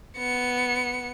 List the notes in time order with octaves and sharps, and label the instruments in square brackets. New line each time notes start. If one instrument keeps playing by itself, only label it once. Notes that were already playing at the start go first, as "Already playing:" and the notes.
[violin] B3 C#7